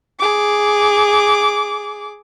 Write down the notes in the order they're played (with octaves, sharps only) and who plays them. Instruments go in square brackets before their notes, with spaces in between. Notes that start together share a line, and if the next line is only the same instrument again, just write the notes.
[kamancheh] G#4 D6